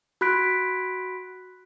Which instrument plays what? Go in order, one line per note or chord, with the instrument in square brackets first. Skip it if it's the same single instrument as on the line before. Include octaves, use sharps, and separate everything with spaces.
[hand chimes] F#4 B5 F#6 B6 D7